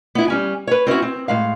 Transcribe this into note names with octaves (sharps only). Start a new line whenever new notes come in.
B3 E4
G3 C#4 G#5
B4 C#5
C4 C#4 E4 F#4
C4
A2 G#3 F5